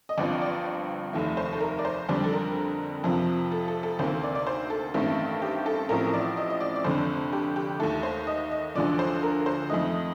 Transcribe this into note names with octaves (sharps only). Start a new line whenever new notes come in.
D#5
G1 G2 F3 C4 D5
D5
F1 D#2 D#3 A3
C5
A4
A#4
D5
C5
F2 D3 G3 C4 D5
A4
A#4
F2 C3 F3
A4
A4
A4
D2 C3 D#3 A#3 C5
D5
D5
C5
A4
A1 G2 D#3 A3 C4
G4
A4
A1 A2 F3 C4 A#4
D5
D#5
D#5
D5
D5
F1 F2 D3 C5
G4
G4
D#2 D#3 A3 A4
C5
D#5
D#5
D2 D3 F3 D5
C5
A#4
C5
F2 D#3 A3 D#5